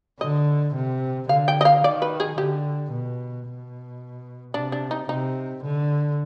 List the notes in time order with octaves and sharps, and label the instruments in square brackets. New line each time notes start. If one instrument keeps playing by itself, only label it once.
[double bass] D3 [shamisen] D#5
[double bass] C3
[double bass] D3 [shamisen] F5
[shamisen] G5
D#5
F5
[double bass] D#3 [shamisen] D5
[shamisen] B4
G#4
[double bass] D3 [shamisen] G4
[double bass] B2
B2
[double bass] C3 [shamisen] D4
[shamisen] D4
D#4
[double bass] C3 [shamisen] D#4
[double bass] D3